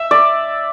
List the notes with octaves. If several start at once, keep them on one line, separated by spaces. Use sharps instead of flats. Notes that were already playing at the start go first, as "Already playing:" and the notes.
Already playing: E5
D5